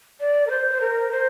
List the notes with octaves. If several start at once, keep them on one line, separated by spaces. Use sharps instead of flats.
D5
A#4
C5
C5
A#4
C5